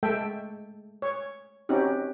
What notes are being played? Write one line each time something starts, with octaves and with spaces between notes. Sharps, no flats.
G#3 A3 A4 E5 G5
C#5
C4 C#4 D#4 F#4 G4